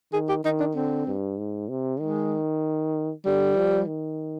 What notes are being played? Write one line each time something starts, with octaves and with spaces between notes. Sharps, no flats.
D#3 G#4
G4
D#3 D#4
D4
D3 C4
G2
G#2
C3
D#3 G#3
D3 G3
F3
D#3